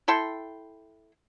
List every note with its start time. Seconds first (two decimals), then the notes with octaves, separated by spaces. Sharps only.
0.08 E4 A4 G5 C6